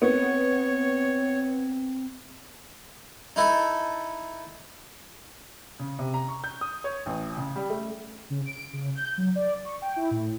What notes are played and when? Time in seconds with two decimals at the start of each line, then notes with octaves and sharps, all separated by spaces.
0.02 B3 C4 C#5
3.36 D#4 E4 A4
5.79 C#3
5.99 C3
6.14 A#5
6.28 C#6
6.44 G6
6.61 D#6
6.84 C#5
7.06 A1
7.37 C#3
7.56 G3
7.70 A3
8.30 C#3
8.46 D7
8.73 C#3
8.95 G6
9.18 F#3
9.35 D5
9.65 C#6
9.82 G5
9.96 E4
10.11 A2